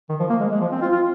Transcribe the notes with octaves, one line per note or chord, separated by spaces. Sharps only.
D#3
F3
A#3
G#3
G#3
F3
C4
F4
F4